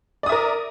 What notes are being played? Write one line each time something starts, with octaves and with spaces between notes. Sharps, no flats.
A#4 D5 E5 D#6